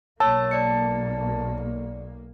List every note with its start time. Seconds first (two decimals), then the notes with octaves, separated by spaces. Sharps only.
0.20 B1 A#3 C#5 A5 E6
0.51 D5 C#7